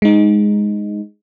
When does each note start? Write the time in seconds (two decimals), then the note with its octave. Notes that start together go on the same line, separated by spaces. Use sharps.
0.02 G#3 D#4